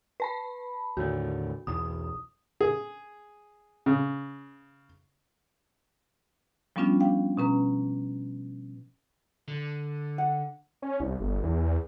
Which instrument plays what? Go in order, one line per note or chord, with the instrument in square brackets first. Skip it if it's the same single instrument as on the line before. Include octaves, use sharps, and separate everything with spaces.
[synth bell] B4 A5 B5
[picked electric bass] D#2 A2 D3 [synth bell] F#4
[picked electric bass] B1 E2 [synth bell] D#6
[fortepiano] G#4
C#3
[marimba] F3 G3 B3 C#4 D4 F4
F5 G5
B2 C#4 B4 A#5
[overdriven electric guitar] D3
[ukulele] F#5
[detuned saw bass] C#4
C2
G1
E2